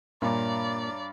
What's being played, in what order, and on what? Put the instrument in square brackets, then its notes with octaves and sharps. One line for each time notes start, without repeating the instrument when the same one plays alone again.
[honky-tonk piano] G2 [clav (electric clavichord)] A#2 [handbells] C#5 E5 A#5 [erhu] D5